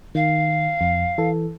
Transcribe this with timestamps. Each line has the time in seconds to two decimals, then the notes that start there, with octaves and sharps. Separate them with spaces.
0.15 D#3 F5
0.81 F2
1.18 E3 A4